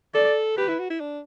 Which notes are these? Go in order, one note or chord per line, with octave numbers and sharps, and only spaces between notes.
A4 D5
G4 B4
E4
F#4
E4
D4